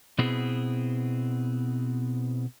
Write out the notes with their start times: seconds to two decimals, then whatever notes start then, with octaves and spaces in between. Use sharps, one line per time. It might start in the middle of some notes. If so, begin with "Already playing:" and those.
0.18 B2 B3 C4 E4 G#4